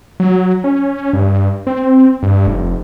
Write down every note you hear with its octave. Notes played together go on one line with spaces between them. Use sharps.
F#3
C#4
G2
C4
G2
F1